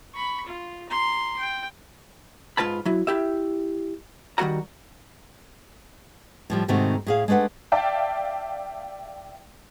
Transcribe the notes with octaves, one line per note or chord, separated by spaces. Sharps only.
B5 C#6
F4
A#5 C6
G5
G#2 F4 B4 A5 B5
F#3 E4
E4 G4 E5
D#3 G3 F#4 F#5 A#5
A2 F3 G3
G#2 C3 D#3 A3 C4 F#4
A2 G#4 F5
G#3 A3 D4 B4 F#5
D5 E5 F5 G5 A5